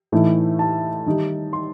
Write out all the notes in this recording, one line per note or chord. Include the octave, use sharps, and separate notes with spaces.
A2 E3 A3 D#4
A5
D#3 G3 D#4
C6